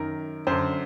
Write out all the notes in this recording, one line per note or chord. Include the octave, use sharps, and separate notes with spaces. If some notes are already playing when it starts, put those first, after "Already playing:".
Already playing: F#2 D#3 A#4
F#2 D3 C5